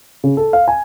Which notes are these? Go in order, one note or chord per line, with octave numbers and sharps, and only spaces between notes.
C#3
A4
F5
G#5